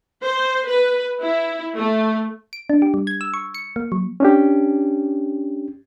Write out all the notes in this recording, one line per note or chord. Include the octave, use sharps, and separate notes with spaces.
C5
B4
E4
A3
D7
D4
G4
G3
G#6
E6
C#6
C#7
A#3
F#3
C#4 D4 G4